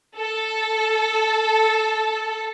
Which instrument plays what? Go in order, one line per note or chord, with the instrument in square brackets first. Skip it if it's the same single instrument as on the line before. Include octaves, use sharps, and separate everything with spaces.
[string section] A4